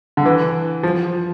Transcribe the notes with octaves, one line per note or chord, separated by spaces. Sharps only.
D3
E3
F3